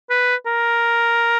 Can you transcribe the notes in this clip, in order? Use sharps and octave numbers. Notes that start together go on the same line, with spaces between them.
B4
A#4